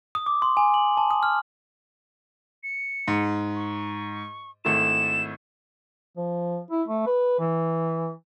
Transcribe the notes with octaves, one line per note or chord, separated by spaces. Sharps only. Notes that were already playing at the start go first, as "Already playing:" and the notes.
D#6
D6
C6
G#5
F#7
A5
D#6
F6
C#7
G#2
C#6
G#1 A3 E4 E7
F3
E4
A3
B4
E3